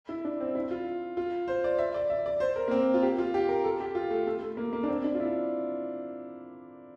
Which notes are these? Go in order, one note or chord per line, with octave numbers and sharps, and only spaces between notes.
E4
D4
C4
E4
F4
F4
C5
D5
E5
D5
E5
D5
C5
A#4
A#3
C4
F4
G4
F4
G4
A#4
A4
G4
F4
A3
A3
A3
A#3
A#3
D4
C4
D4
F4
E4